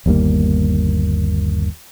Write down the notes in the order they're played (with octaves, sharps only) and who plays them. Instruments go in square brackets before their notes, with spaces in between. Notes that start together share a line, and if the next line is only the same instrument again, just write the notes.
[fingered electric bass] G1 D#2 G3 A#3